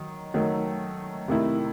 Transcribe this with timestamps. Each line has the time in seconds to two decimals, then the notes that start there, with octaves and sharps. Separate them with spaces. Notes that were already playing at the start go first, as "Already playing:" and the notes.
Already playing: D#3 F#3
0.34 D#3 F#3 A3
1.28 C3 D#3 A3 E4